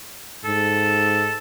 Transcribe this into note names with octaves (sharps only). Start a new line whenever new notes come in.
G#2 A4